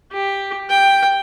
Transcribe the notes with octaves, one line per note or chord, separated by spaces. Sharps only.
G4
G5